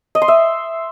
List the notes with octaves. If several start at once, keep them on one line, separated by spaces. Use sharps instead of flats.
D#5
C6
E5